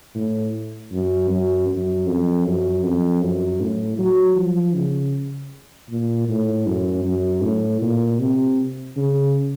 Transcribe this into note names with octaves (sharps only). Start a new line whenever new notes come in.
A2
F#2
F#2
F#2
F2
F#2
F2
F#2
A2
F#3
F3
C#3
A#2
A2
F#2
F#2
A2
A#2
C3
C#3